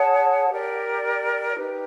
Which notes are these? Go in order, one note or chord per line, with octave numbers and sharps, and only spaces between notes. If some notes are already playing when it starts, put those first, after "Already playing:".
Already playing: G#4 C#5 F#5 A5
G4 A#4 D5
D#4 G4 B4